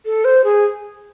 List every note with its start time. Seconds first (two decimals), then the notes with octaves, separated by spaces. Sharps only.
0.05 A4
0.24 C5
0.44 G#4